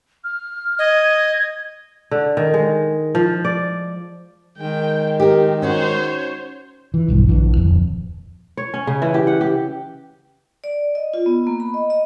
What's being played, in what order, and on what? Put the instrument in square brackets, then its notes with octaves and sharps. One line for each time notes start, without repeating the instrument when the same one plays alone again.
[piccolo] F6
[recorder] D#5 [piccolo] G#6
[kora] D3
D#3
G#3
F3
D5
[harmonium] D#3 G#3 [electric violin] G5
[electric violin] D#4 [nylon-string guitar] G4 A#4
[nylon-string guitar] C#4 D#4 F#4 [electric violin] C5 C#5
[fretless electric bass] E3
D#1 B1 G2
A#1 D3 E3
D#1 F2
[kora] C#5
C#4
C#3
E3
G4
F#5
G4
[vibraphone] D5
D#5
F4
B3
A#3
B5
D#5
D#5